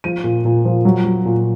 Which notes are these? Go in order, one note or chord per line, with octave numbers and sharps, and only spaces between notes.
F3 D#7
A#2
A#2
F3
F#3
F#3
A#2